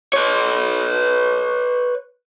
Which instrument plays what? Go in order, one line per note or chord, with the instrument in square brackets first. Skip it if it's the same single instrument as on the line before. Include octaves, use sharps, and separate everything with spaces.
[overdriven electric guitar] B4 C#5